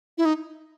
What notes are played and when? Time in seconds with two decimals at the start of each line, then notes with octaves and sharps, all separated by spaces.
0.18 E4
0.25 D#4